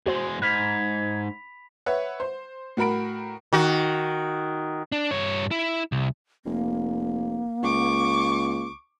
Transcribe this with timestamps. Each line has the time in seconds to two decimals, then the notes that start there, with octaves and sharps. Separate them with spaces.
0.06 E2 G#3 F#4 C5
0.42 G#2 B5 F6 G#6 B6 F7
1.86 B4 C#5 E5 F#5
2.20 C5
2.77 A2 F#4 A#4 B5 D7
3.53 D#3 F#4
4.92 D4
5.11 G2 C#5
5.51 E4
5.92 C2
6.45 F1 A#3
7.63 C#2 C#6 D6